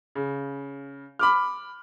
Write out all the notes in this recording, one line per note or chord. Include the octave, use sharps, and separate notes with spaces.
C#3
B5 D6 F6